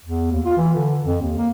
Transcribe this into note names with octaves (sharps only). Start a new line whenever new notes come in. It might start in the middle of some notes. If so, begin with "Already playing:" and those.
E2
D#2
F4
E3
D3
F2
D#2
A#3